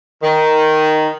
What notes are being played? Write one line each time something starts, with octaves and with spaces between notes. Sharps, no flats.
D#3